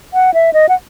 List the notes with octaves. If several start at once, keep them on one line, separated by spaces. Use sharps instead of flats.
F#5
E5
D#5
F#5